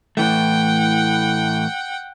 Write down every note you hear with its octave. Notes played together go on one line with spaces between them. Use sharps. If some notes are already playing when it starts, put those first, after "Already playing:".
A2 E3 A3 F#5 G5